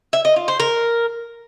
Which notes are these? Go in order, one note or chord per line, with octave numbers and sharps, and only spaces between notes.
E5
D#5
F4
C5
A#4